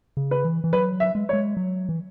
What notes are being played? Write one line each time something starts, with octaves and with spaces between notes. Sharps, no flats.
C#3
B4
E3
E3
F#3 B4
E5
G#3
C#5
G#3
F#3
E3